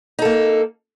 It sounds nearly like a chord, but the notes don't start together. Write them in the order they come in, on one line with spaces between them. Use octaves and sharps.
D#4 A4 A#3